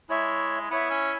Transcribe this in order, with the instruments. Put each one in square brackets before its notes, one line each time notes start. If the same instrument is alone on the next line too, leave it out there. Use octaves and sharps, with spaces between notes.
[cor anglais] G#3 [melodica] E4 C#5 E5
[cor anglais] B3 [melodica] E4 C#5 E5
[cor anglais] C#4